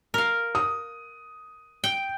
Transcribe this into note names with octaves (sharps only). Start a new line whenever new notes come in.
A#4 F5
D#6
G5